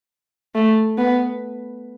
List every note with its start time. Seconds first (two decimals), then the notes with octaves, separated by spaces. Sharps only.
0.55 A3
0.98 B3